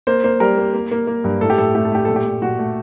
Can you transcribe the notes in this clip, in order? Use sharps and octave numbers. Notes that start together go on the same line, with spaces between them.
A#3 C5
A#3 C5
G3 A#4
A#3
A#3
A#3
A#3
G2
A2 A4
G4
A2 A4
A3 G4
A4
A3 G4
A#2 A4
G4
A3
A#2 F#4
A3